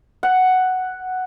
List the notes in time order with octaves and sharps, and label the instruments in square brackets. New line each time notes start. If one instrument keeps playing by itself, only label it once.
[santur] F#5